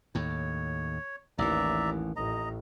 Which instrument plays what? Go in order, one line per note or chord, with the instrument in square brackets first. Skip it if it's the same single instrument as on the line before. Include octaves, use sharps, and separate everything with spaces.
[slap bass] D#2 A2 [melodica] C#5
[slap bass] A1 E3 [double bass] D#2 [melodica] D5 E5 A#5
[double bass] A1 [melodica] D#5 A#5